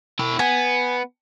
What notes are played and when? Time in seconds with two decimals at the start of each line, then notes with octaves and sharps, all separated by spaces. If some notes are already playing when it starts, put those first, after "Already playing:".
0.19 E4 G5
0.39 B3 G#5